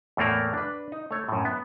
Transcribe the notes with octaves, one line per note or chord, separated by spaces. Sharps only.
E2 A2 A3 A#3 A#4
D4 B4
D#4
A3 C#5
F#2 A2
B3